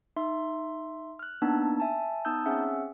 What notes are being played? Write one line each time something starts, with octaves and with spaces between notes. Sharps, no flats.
D#4 E5 C6
F6 F#6
A#3 B3 D4 D#4 A5
E5 G#5 A5
B3 D#4 A5 D#6 E6 G6
C4 C#4 G#4 E5 F#5 E6